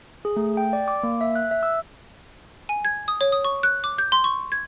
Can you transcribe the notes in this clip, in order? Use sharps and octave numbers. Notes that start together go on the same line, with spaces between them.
G#4
A3
G5
D5
D6
A#3
E5
F#6
E5
E6
G#5
G#6
D#6
C#5
D#6
C#6
F#6
D6
G6
C6
C#6
G#6